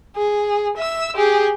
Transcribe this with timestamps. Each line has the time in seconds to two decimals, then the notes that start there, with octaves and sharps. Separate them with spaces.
0.16 G#4
0.77 E5 E6
1.16 G4 G#4